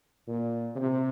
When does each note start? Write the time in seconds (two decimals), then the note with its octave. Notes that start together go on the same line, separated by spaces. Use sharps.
0.28 A#2
0.76 C3